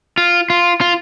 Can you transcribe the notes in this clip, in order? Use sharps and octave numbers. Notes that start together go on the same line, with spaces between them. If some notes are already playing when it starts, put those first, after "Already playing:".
F4
F4
F4